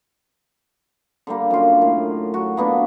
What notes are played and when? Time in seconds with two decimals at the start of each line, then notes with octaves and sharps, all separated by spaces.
1.27 D3 G3 A#3
1.51 F#2 F4
1.82 A2
2.34 F#3 F#4
2.57 A#3 B3 D4